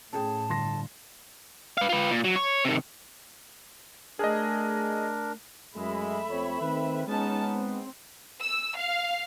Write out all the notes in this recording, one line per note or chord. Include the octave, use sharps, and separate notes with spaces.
A2 C#4 G#4 G5 A5
G1 C6 A#6
B4 F5
F4 B4
A#2
F#3
C#5
C3 D#3
A3 D4 G#4 A#4 D#5
F#2 G#3 A3 E5 B5
F2 C4 C#5
D#3 C4 B4
G#3 B3 C#4 D#4 A5
C4
E6
F5